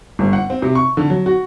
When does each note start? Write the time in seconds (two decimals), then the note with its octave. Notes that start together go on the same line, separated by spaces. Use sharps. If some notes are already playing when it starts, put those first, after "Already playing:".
0.19 G1
0.33 F#5
0.50 C4
0.62 C3
0.75 C#6
0.97 D3
1.10 F#3
1.26 F#4